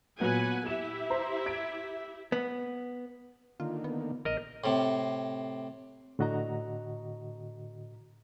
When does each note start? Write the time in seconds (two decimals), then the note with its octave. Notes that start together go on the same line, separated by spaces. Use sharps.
0.20 A#2 F#3 B3 B4 F#5 G#5
0.66 E4 G4 E5 E7
1.10 C5 A#5
1.46 G#6 B6 D7
2.32 B3
3.60 D3 D#3 A#3 F4
3.84 B3
4.25 A#1 A#4 D#5
4.64 A2 C3
6.19 A2 D3 F#4 D#5 A#5